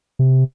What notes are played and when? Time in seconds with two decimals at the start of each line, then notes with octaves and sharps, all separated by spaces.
0.19 C3